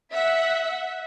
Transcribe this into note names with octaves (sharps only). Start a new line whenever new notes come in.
E5 F#5